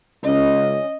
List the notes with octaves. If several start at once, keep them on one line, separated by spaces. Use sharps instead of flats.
C#2 C#4 D#5